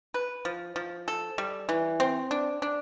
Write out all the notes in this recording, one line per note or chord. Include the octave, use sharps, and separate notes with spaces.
B4
F3
F3
A4
G3
E3
C4
D4
D4